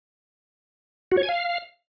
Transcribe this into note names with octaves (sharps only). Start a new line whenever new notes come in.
F#4
C#5
G#5
F5